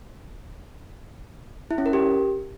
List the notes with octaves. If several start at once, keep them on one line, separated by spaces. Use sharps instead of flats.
E4
C#4
A#4
G4